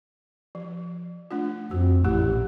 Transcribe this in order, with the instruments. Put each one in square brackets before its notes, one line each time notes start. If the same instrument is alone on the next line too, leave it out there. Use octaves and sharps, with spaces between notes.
[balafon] F3
A3 D4 F4
[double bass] F2 [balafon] F#4
[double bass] A1 [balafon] A3 E4 G4